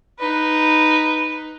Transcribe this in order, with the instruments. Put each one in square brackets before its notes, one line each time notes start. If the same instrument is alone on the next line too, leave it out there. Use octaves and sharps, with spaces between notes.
[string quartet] D#4 B4